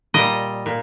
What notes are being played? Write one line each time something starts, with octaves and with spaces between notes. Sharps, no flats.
A#2 G3 D#5
A#2